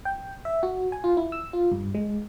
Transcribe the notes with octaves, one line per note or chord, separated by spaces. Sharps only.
G5
E5
F#4
G#5
F4
E4
E6
F4
G2
G#3